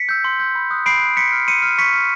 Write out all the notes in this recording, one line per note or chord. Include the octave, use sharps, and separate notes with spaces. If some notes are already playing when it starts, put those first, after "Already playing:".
Already playing: B6 C#7
E6 G6
C6
E6 G6
B5
D#6 F#6
B5 C7 D7
D#6 F#6
C6 B6 C#7
F6
C6 C#7 D#7
F6
C#6 B6 C#7
F6